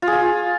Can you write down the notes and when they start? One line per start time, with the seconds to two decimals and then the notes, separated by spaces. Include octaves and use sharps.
0.02 F4
0.08 G#4
0.13 F4